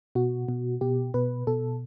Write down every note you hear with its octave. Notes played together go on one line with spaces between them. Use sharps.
B2 F#4
B2
B2 G4
B2 B4
B2 A4